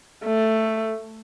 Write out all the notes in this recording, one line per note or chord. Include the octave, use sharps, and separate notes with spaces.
A3